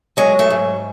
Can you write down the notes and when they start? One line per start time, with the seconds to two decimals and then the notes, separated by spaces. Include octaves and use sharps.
0.17 F#3 G#3
0.39 A3
0.50 G#2